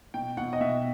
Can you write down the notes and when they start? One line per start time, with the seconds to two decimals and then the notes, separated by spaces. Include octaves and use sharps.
0.14 B2 G5
0.37 B2 F#5
0.53 D#5
0.61 B2 E5